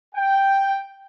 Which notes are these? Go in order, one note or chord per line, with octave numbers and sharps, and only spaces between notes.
G5